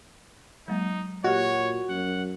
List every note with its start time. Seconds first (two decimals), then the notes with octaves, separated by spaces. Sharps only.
0.68 F#3 G#3 A#3 D#4
1.24 A#2 F#4 G4 C#5 D#5
1.89 F#2 F#5